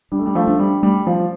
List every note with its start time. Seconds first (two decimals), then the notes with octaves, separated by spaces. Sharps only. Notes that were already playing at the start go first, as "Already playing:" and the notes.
0.12 G3 D4
0.19 A3
0.26 G3
0.35 F3 A3
0.47 D4
0.59 G3
0.83 G3 A3
1.06 F3